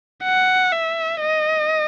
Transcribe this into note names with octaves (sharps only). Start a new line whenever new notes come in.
F#5
E5
D#5